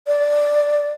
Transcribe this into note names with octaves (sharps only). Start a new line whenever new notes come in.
D5